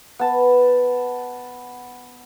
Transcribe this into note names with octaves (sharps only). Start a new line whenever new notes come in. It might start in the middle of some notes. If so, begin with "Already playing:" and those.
B3 A5